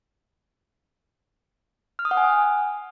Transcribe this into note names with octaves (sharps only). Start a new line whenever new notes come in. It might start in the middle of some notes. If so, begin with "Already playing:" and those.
F6
D#6
F#5
G#5